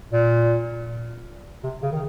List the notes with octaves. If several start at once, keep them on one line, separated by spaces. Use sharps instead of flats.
A#2
C3
C#3
D#3